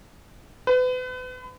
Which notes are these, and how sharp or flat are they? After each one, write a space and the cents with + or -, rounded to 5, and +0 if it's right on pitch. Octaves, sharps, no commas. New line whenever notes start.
B4 +35